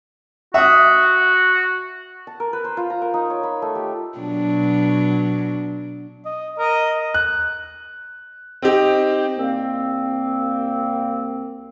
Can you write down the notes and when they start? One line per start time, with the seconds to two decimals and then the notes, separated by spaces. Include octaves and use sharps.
0.54 F#4 E5 D#6
2.27 A5
2.40 A#4
2.53 B4
2.64 C5
2.77 F4
2.90 A#5
3.02 A#4
3.14 D#4
3.30 C#5
3.43 B5
3.62 A3
3.75 G4
4.18 B2 F#3 D4
6.25 D#5
6.58 A#4 D#5
7.14 F#6
8.62 C4 D#4 G4
9.37 C2 A#3 C4